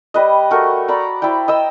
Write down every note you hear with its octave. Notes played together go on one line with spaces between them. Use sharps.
G3 B4 D#5
A3 F#4 A#4
D5 A#5 B5
E4 C5 D5 G5
D#5 G5 E6